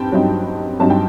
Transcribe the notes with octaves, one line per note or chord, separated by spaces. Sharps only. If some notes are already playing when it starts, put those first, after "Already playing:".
Already playing: G2 C4 G5 A5 B5
G2 F#3 C4 D#4
G2 F#3 C4 D#4 A5
G5